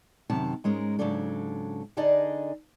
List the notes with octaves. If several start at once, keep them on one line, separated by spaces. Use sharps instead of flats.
F#2 C3 D#3 A5
G#2 G#3 C#4 A#4
G#2 C#3 F#3 D4 A4
D3 D4 D#4 G#4 D5 D#5